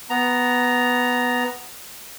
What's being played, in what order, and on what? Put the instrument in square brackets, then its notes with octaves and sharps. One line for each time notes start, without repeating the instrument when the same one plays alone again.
[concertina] B3 A#5